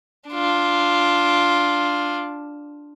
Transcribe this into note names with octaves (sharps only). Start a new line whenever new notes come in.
D4 F4